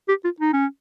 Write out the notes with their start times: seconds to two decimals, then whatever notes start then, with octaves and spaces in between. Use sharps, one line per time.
0.08 G4
0.24 F4
0.40 D#4
0.53 C#4